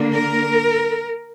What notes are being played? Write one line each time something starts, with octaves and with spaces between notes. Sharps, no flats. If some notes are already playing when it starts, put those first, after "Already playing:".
Already playing: D3 A#3 D4
A#4